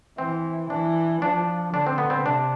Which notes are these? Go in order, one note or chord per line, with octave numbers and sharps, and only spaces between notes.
E3 C4
E3 D4
F3 D4
D3 D4
C4
B3
C4
C3 D4